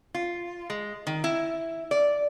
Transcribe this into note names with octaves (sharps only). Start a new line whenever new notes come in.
F4
G#3
D#3
E4
D5